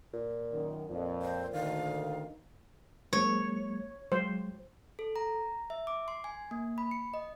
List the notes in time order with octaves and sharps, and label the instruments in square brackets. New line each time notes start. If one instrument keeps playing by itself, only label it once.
[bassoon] A#2
[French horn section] F#2 D#3
[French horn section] F2 [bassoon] A#2
[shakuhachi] C5
[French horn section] D2 D#3 [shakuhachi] F5
[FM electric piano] F#3 G#3 A#3 [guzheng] C#5
[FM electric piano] F#3 G#3 [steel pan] C5
[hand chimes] A4
A#5
E5
D6
C6
G#5
A#3
B5
C#7
D#5